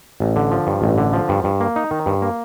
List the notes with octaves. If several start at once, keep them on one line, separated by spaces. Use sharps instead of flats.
A1
D3
F3
G2
A1
D3
F3
G2
G2
A#3
D#4
D#3
G2
A#3